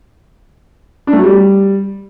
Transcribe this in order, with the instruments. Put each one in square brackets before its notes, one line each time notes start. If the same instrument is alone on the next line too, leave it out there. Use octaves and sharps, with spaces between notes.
[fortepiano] D4
A3
F#3
G3